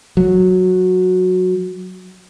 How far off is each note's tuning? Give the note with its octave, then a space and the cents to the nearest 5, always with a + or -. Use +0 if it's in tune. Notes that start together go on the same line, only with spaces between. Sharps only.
F#3 -10